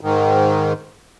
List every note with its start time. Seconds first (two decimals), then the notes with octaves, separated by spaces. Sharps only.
0.01 G#2 D#3